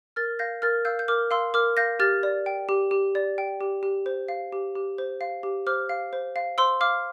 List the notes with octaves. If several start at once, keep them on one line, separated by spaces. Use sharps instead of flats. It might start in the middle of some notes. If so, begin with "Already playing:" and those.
A#4 F6 A6
F5 G6 A#6
A#4 F6 A6
F5 E6 G6
G6
A#4 D6 F6
F5 C6 E6
A#4 D6 F6
F5 G6 A#6
G4 F6 A6
D5
G5
G4
G4
D5
G5
G4
G4
C5
F5
G4
G4
C5
F5
G4
C5 D6 F6
F5
C5
F5
C5 C6 E6
F5 D6 F6